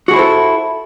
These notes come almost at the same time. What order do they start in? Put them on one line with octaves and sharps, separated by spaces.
F#4 G#4 E4 C5 A4